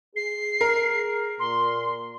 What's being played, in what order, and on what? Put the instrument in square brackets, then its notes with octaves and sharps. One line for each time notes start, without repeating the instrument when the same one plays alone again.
[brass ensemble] G#4 [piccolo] C7
[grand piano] A#4
[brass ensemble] A#2 [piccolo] C6